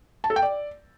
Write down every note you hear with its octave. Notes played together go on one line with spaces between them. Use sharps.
A5
A4
G5
D5